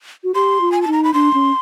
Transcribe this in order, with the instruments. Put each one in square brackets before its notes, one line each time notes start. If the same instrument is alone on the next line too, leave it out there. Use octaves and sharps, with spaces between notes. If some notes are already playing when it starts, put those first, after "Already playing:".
[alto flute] F#4
[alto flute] G4 [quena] C6
[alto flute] F4
[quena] G#5
A5
[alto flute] D#4
[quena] A#5
B5
[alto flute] D4 [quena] C6
[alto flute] C#4